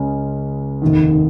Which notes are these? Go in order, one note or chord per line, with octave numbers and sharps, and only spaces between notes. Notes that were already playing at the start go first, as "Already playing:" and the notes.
Already playing: C#2 C#3 G#3 C#4
F1 D#2 D#3